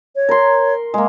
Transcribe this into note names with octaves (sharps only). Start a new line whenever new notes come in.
C#5
A#4 C6
G#3 A#3